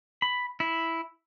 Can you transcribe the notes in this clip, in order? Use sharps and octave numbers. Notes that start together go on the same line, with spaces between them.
B5
E4